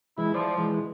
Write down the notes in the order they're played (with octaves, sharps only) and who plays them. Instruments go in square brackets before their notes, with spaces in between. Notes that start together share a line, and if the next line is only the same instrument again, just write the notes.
[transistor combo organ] E3 G#3 [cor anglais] E4
[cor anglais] F3 [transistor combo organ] C5 D5
[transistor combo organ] E3 G#3